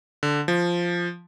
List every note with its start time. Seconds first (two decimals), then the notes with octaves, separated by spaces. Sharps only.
0.23 D3
0.48 F3